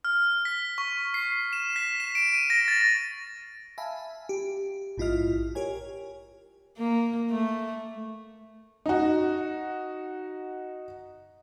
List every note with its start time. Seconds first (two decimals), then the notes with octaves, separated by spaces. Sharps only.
0.05 F6
0.45 B6
0.78 C#6
1.14 C7
1.53 E7
1.76 B6
2.00 E7
2.15 D7
2.35 D#7
2.50 A#6
2.68 A6
3.78 E5 F5 G#5 A5 B5
4.29 G4
4.98 A#1 G#2 E4 F4 D#5 F6
5.55 G4 A#4 C#5 G#5
6.78 A#3
7.30 A3
8.86 D#4 F#4